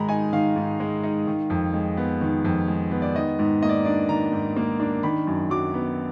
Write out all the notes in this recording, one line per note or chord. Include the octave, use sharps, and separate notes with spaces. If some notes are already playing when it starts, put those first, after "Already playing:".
Already playing: G#2 D#3 G#3 A#5 B5
D#4 G#5
D#3 F5
G#2
G#3
D#4
D#3
F2
G#3
B3
D#3
F2
G#3
B3
D5
D#3 D#5
G#2
A#3 D#5
D5
D4 D5
D#3 A#5
G#2
A#3
D4
D#3 B5
F#2
F#3 D6
B3